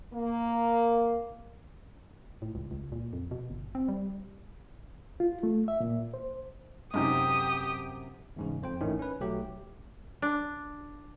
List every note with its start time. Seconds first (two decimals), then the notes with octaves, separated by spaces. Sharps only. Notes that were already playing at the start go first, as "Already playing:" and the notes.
0.13 A#3
2.42 A2
2.55 C#2
2.71 C#2
2.92 A#2
3.13 F2
3.31 B2
3.50 G1
3.75 C4
3.88 G3
5.20 F4
5.43 A3
5.68 E5
5.80 A#2
6.14 C5
6.94 F#2 C3 G#3 C#4 D#4 G4 D#6
8.36 E2 G#2 C#3
8.62 F2 C5 G5
8.81 A1 G#2 D#3 A3 C#4 E4
8.99 C#4 B4
9.20 B1 F#3 A3 G4
10.22 D4